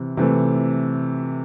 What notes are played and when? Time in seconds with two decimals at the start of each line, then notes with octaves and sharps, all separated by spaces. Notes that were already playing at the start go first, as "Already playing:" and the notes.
Already playing: C3 E3
0.17 C3 E3 A3